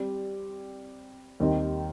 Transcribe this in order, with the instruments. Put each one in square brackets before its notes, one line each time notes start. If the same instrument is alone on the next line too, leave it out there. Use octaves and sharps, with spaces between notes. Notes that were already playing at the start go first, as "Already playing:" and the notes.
Already playing: [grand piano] G3 C4 G4 D5
D#2 D#3 G3 C4 D#4